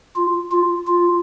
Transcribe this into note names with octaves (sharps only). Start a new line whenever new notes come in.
F4
F4
F4